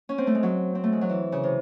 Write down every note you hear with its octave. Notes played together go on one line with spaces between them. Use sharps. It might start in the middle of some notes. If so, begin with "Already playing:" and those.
C#4
C4
A3
G#3
F#3
C4
A3
G#3
F#3
E3
C#3
C3